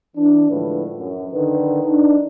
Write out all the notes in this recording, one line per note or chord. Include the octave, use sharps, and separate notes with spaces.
E3 D4
A2 D3 F3 G#3 B4
F#2
D3 D#3 A#4 B4
D4 D#4